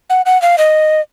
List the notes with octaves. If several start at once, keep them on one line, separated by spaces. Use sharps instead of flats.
F#5
F#5
F5
D#5